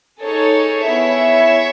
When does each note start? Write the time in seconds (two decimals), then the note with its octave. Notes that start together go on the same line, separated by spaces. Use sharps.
0.20 D#4 G#4 A4 C#5
0.86 B3 E4 G#4 C#5 E5